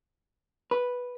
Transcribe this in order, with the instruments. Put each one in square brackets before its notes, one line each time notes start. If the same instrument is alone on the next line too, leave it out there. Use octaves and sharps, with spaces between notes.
[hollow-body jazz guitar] B4